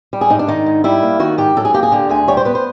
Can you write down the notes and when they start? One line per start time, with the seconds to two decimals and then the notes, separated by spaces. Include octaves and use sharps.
0.13 G3
0.21 G#4
0.30 G#2 D#4
0.39 D4
0.48 D#3 D#4
0.66 G#2
0.84 G3 E4
1.03 A#3
1.19 D#3 F#4
1.38 G#2 G4
1.57 F#3 A4
1.65 G#4
1.74 A#3 G4
1.83 G#4
1.92 D3 G4
2.09 D2 G#4
2.28 G3 C#5
2.37 C5
2.45 B3 B4
2.55 C5